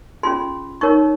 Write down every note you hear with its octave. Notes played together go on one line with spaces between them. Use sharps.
C#4 F4 G#4 C6
D#4 A#4 C#5 C#6